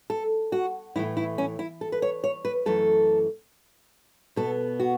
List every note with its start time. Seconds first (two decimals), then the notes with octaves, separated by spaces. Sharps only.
0.10 A4
0.52 F#4
0.96 A2 E3 A3 E4
1.17 E4
1.38 C#4
1.59 E4
1.81 A4
1.92 B4
2.02 C#5
2.24 C#5
2.45 B4
2.66 F#2 E3 A3 A4
4.36 B2 B3 A4
4.80 F#4